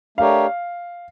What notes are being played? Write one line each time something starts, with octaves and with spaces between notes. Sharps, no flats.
A3 D4 G4 A#4 C#5 F5